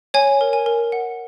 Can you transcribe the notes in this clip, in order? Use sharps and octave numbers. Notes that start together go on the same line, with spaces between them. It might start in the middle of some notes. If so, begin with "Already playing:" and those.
C#5 G#5
A#4
G#5
A#4
F#5